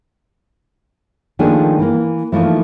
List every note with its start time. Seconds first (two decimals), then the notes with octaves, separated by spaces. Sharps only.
1.39 D#3 F3 A3 A#3 D4 G#4
1.79 E3 A#3
2.32 E3 F3 A3 A#3 D#4